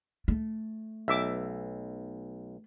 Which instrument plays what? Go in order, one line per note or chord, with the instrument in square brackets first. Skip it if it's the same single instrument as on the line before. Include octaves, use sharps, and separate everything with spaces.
[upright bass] A3
[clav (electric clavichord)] B1 [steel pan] E5 D6